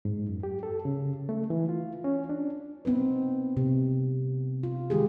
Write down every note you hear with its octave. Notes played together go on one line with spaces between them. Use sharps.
G#2
F#2
G4
A4
C#3
A3
E3
F4
C#4
D4
B3 C4 D#4 B4
C3
F4
D#3 G#3 G4 G#4